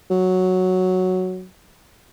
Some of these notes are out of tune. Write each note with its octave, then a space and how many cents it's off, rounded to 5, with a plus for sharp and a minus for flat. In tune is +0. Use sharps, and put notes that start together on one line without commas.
F#3 +0